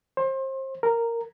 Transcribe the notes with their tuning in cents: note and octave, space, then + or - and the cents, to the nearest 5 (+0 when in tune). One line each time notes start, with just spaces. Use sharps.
C5 +30
A#4 -10